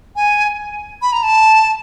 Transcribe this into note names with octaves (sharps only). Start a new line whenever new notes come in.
G#5
B5
A#5
A5